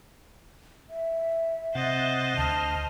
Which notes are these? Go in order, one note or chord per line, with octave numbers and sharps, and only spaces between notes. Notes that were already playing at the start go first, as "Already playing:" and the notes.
E5
C3 C5 D#5 F#5 A6
D2 A5 F6